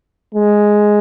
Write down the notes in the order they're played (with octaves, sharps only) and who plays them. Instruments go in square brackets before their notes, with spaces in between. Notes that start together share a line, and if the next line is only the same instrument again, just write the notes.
[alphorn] G#3